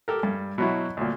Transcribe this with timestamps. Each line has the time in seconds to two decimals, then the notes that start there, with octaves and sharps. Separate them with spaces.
0.08 G4 A4 A#4
0.23 G2
0.58 B2 F#3 E4
0.97 D2 A#2